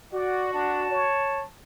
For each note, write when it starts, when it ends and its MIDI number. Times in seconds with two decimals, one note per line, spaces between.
0.13 1.04 66
0.13 0.51 74
0.53 0.89 62
0.53 1.46 81
0.91 1.44 73